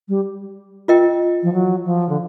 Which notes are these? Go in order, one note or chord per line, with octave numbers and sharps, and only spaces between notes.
G3
F4 A#4 D#5 G5
F3
F#3
F3
D3